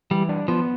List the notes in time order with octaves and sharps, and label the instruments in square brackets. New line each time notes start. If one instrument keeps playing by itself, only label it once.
[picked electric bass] E3 [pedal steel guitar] G3
[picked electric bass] D4
[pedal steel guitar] F3 [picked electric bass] B3